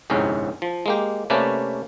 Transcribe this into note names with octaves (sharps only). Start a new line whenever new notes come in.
G1 C2 F2 G#2 C#4 A#5
F3
G#3 A#3 G4
C3 A3 A#3 C#4 B4 D5